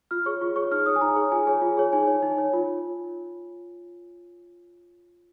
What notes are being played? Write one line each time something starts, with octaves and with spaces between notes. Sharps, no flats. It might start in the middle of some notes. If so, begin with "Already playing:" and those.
F4 F6
G#4 C#5 C#6
F4 C#6
G#4 C#5 C#6
D#4 F6
G#4 C#5 D#6
G#5
D#4 A#5
G#4 C#5
F4 G#5
G#4 C#5 G#5
F4
G#4 C#5
D#4 G#5
C#5
D#4
C#5
F4